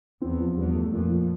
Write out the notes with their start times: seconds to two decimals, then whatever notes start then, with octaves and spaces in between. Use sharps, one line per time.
0.21 E2 C4
0.40 F3
0.57 E2 G2
0.75 A3
0.92 F2 A#2
1.09 F3